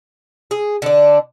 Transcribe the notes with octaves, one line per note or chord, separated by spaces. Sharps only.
G#4
D3 D4